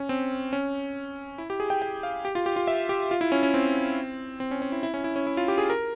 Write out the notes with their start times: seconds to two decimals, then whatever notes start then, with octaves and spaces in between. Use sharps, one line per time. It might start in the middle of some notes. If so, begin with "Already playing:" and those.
Already playing: C#4
0.09 C4
0.53 C#4
1.38 E4
1.50 G4
1.60 G#4
1.70 G5
1.82 G5
2.03 F5
2.25 G4
2.35 F4
2.46 G4
2.56 F4
2.67 E5
2.89 G4
3.11 F4
3.21 E4
3.32 C#4
3.43 C#4
3.54 C4
4.40 C4
4.51 C#4
4.62 C#4
4.72 E4
4.83 E4
4.94 C#4
5.04 E4
5.16 C#4
5.27 E4
5.37 F4
5.48 G4
5.58 G#4
5.70 A#4